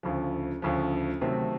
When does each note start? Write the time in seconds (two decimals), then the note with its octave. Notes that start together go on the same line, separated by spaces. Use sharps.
0.03 D2 C#3 F3
0.62 D2 C#3 F3
1.21 C3 D#3 F#3 A3 C4